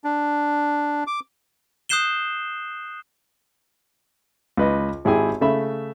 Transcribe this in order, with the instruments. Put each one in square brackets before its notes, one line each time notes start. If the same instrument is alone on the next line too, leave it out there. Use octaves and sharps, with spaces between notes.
[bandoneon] D4
D6
[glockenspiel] D#6 F#6 G6 C7 E7 G7
[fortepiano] C#2 B4 D#5
G#1 E4 G4 G#4 G#5
C#3 A3 E5 B5